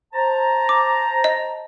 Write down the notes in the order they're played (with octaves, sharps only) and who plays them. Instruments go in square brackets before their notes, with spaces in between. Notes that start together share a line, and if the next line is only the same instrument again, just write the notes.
[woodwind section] C5 A5 A#5
[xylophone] D6
D#5